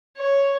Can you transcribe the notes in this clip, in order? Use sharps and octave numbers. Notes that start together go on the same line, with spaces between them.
C#5